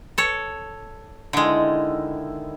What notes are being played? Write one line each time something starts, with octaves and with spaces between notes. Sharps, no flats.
A4 C#5
D3 D#3 G#3 E4